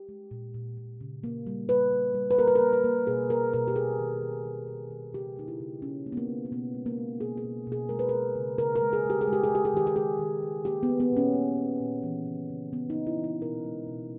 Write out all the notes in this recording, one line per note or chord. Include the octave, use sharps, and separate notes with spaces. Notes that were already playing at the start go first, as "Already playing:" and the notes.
Already playing: G4
G#3
A#2
A#2
A#2
C#3
A#3
G3
G3 B4
G3
G3
B4
A#3 A#4
B4
A#4
A#3
B4
A#3
B2 G#4
A#3 A#4
B2 A#4
G4
A#3 G#4
D#3
D#3
D#3
D#3
D#3
C#3 G4
A#3 D#4
E4
C#3
C#3 C#4
A#3
B3
A#3
C#3
A#3
B2 B3
G#3
A#3
G#3
B2 G#4
G#4
B2
B2
G#4
G#3 A#4
B4
G#3 A#4
C#3
C#3 A#4
A#4
G#3
G#4
G#3 G4
G#4
G#3
G4
G#4
G#3
G4
G#4
D#3 G4
G4
G#3 G#4
D#3
G#3
A#3 G4
B3
A#3
B3
A#2 C#4
A#3
A#3
A#2
E3
C#3
C#3
C#3 B3
D#4
A#3
E4
E3
E4
B2 A#4
G#3
B2